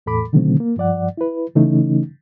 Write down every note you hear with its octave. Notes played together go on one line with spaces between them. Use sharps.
E2 A2 A4 B5 D6
B2 D3 D#3 F#3 A3 C4
A#3
G2 F3 D5 F#5
E4 B4
C#3 E3 A3 C#4 D#4